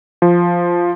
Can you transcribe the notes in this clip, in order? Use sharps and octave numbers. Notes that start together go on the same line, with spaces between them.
F3